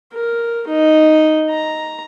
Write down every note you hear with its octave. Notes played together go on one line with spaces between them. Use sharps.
A#4
D#4
A#5